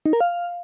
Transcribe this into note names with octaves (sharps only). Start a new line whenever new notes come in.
D#4
A#4
F5